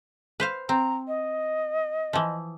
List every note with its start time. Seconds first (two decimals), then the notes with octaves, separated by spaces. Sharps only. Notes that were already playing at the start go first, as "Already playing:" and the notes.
0.40 B4 C5 F5
0.69 C4 A#5
1.08 D#5
2.13 E3 F3